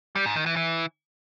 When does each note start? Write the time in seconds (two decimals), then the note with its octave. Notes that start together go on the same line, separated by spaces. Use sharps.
0.16 G3
0.26 G#2
0.36 D#3
0.46 E3
0.56 E3